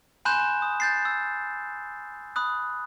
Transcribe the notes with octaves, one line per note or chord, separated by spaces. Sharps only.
G#5 B5 C6 F#6 G6 E7
D#6
G6 A6 C7
E6
B5 D#6 F#6